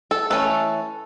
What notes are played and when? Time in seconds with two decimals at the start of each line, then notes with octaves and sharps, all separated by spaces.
0.11 A4
0.30 E3 A3 C#4 A4